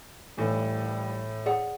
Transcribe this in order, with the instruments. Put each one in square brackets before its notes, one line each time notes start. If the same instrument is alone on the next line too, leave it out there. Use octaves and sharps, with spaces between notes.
[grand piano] A2 E3 [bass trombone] G3
[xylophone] G#4 D5 F#5